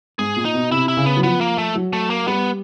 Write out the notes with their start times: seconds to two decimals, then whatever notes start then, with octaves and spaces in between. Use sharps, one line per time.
0.19 G#2 G#4
0.36 A#2
0.45 D#4
0.54 B2
0.71 C3 E4
0.88 E4
0.97 C#3
1.06 B3
1.17 F#3
1.23 F3 B3
1.41 A#3
1.58 A3
1.75 F#3
1.93 A3
2.10 A#3
2.28 G3 B3